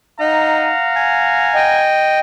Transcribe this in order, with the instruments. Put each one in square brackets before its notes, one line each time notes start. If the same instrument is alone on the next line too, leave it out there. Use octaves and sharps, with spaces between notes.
[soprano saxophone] D#4 [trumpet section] F5 F#5 A#5
[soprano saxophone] G#5
[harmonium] D#5 G5